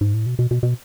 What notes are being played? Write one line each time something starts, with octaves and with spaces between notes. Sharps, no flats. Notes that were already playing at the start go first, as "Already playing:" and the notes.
G#2
A2
B2
B2
B2
B2